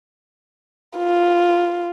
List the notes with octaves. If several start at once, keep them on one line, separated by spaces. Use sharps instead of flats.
F4